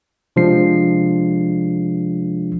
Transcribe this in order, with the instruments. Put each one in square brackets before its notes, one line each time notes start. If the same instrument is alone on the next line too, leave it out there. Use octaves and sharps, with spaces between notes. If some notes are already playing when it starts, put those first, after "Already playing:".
[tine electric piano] C3 F3 G#3 D4 C7